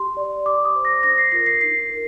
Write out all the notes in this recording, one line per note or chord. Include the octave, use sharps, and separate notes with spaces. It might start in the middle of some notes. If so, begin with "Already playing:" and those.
Already playing: G4 C6
D5
G4 D6
D#6
C5
A#6
D4 A#6
C7
F4 A#4 A#6
C7
D#4 C7
A#4